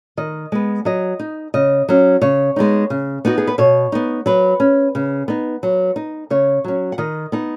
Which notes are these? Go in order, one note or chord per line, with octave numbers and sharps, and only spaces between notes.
D#3 D#5
G#3 B3
F#3 D#5
D#4
C#3 D#5
F#3 C#4
C#3 C#5
G#3 B3 D#4
C#3
B3 D#4 F#4
G#4
B4
B2 C#5
B3 D#4
F#3 B4
C#4
C#3
B3 D#4
F#3
D#4
C#3 C#5
F#3 C#4
F#5
D#3 D#5
B3 D#4